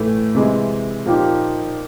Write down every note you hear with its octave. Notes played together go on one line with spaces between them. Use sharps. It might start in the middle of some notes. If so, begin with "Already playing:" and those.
Already playing: A2 E3 A3
C3 E3 G#3
A#2 F3 A#3 D#4 G4